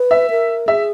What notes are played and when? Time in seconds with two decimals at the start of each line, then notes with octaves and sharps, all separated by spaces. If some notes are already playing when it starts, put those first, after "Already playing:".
Already playing: B4
0.11 E5
0.30 A#4
0.67 G#4 E5